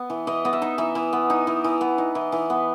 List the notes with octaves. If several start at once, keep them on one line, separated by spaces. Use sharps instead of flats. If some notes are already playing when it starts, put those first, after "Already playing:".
Already playing: B3
E3
E3 D#5
B3 D#5
E5
D#4
E3 E5
E3
B3
D#4
E3
E3
B3
D#4
E3
E3
B3